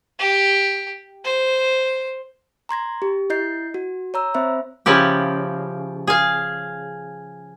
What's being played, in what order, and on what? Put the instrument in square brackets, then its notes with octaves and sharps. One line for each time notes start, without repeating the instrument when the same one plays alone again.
[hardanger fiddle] G4
C5
[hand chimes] A#5 C6 G#6 A#6
G4
E4 D#5 G6 C7
F#4
C#5 A#5 E6
C4 C5 E5 B5
[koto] C#3 F3 E4 G4
G#4 F5